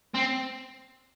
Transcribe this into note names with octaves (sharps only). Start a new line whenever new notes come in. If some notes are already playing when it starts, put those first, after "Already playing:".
C4